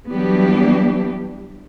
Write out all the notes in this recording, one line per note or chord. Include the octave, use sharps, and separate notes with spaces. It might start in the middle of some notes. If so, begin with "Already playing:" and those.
E3 F#3 G3 B3 D4 G4